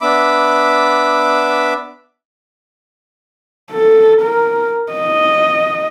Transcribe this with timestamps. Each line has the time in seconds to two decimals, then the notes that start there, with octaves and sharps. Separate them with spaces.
0.01 B3 D4 E5 B5 D6
3.71 A4
4.22 A#4
4.93 D#5